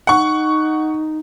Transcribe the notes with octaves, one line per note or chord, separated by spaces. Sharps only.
D#4 F#5 C#6